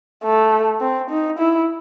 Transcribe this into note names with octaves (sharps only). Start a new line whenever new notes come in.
A3
C4
D#4
E4